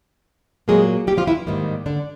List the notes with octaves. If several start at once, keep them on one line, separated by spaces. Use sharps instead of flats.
A#2 F#3 G#3 A#3 G#4
G3 G4
F3 F4
E3 E4
G#2 D#3 G3 A#3
D3 D4